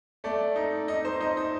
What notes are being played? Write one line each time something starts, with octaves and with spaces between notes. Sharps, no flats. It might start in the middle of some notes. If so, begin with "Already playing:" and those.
A3 D5
D#4
D#4 D#5
C5
D#4 D#5
D#5